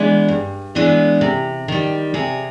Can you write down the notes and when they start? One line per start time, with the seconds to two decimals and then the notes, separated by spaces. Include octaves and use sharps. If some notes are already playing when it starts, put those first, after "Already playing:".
Already playing: E3 G#3 B3 D4 G#4
0.28 G2
0.75 E3 G#3 B3 D4
1.21 C3
1.68 D#3 G3
2.14 C3 G#4